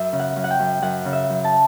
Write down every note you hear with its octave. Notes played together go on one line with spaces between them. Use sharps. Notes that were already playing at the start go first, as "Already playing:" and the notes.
Already playing: F#2 E5
C#3
F#5
F#2
F#5
G5
F#2
F#2 F#5
C#3
E5
F#2
A5